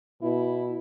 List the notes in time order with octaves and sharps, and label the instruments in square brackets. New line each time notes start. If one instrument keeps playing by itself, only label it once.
[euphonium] B2 [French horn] E4